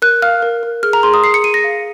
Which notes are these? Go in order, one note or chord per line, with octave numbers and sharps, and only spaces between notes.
A#4 F#6
F5 F6
A#4
A#4
G#4 F6
A#5
G#4 C6
D#6
G#4 C7
C#7
G#4 D#7
A#6
F5